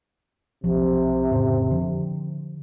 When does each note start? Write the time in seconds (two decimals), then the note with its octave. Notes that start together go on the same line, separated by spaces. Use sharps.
0.64 B1 C3 F3
1.31 F1 A2 C#3
1.71 D3 F3